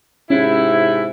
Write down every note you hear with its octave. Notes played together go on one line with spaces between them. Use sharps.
G#2 C3 C#4 E4